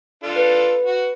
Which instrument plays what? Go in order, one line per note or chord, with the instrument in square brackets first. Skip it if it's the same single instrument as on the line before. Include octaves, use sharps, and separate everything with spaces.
[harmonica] D4 F4 A4
[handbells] B4
[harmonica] F#4